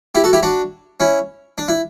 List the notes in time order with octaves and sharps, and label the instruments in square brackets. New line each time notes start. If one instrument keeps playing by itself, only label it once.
[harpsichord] E4 G4
F#4 A4
E4 G4
D4 F#4
C#4 E4
D4
E4